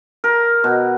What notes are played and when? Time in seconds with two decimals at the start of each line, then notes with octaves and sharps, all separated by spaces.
0.24 A#4
0.64 B2